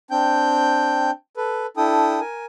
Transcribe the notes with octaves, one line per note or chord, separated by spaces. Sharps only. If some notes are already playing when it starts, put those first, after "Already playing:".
C4 D4 G5 G6
A4 B4
D4 E4 A4 G5 D#6
A#4 G#5